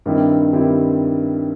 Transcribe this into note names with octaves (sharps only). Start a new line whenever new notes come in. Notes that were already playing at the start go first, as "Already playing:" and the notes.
G2 D#3 G3 C4 E4
G2 D#3 G3 C4 E4